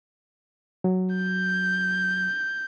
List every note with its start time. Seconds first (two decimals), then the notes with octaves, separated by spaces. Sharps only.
0.84 F#3
1.16 G6